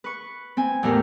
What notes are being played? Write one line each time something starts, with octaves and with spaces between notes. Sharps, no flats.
B4 C#6
C4 G#5
E2 A2 A3 G4 A#4